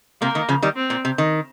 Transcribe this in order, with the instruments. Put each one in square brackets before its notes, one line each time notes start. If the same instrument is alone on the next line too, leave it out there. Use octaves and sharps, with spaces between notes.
[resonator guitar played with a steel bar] C3 [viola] A#3
[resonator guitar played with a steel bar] D#3
C#3 F3
D#3 G3
[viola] C4
[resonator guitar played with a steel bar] A#2
C3
D#3